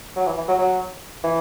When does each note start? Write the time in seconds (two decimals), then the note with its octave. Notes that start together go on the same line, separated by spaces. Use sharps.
0.16 F#3
0.27 E3
0.37 E3
0.48 F#3
0.59 F#3
1.24 E3